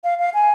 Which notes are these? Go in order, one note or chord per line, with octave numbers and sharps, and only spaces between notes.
F5
F5
G#5